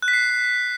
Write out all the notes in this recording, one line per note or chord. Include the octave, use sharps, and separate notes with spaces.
F#6
B6
C7